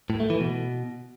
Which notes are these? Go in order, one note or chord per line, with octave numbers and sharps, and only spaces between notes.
A2
A3
E3
B2